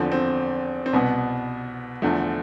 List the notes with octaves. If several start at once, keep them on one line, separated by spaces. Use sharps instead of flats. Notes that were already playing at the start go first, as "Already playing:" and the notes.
Already playing: E2 D3 F3 C4
C4
C4
C2 B2 B3
E2 D3 F3 A3